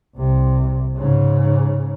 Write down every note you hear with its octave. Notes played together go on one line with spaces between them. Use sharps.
C2 C3
G#2 C#3